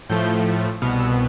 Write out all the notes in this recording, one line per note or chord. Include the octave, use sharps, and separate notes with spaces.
A2 F3 A3 G6
C2 B2 B3 F6
E6